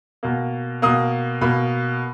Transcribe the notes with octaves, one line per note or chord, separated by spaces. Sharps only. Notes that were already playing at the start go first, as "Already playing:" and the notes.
B2 A#3
B2 A#3 D#6
B2 A#3 B5